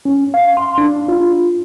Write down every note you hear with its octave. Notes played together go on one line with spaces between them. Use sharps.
C#4
F5
C6
D4
F4